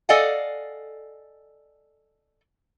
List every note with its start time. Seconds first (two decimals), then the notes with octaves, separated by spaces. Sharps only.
0.09 A4 D5 D#5 F5 F#5 G#5